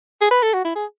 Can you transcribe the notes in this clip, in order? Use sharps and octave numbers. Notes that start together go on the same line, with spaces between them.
G#4
B4
A4
F#4
E4
G#4